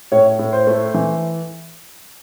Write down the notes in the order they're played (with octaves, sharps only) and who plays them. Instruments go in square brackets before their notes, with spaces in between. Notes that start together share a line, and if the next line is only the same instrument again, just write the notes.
[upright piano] A2 C#5
A2
C5
A3
E3